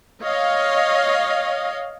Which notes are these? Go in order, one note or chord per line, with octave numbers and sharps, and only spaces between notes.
C#5 D#5 F5